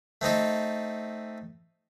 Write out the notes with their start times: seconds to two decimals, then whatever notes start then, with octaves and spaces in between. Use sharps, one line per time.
0.21 A3 C4 D#4 A4